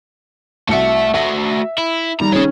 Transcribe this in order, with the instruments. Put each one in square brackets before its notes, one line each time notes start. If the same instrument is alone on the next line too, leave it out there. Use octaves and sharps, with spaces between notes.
[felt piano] C2 F#4 C#7 [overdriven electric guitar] A3 E5
[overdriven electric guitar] A3 F#4 [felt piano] E5
[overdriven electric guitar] E4
[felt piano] D#3 G3 [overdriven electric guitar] A#5
[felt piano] D#3 C#4 [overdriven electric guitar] G#4 C#5